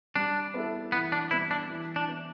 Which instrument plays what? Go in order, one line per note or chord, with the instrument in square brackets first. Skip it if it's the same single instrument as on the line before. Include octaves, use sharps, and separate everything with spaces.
[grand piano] G3 [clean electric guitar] D4
[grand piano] B3 E4 A4
[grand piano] E3 [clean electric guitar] B3
[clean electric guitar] D4
[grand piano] G3 B3 [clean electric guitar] E4
[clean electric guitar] D4
[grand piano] E3
[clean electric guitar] D4
[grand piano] B3 E4